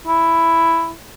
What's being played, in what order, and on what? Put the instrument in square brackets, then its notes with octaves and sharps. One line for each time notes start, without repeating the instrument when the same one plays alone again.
[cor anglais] E4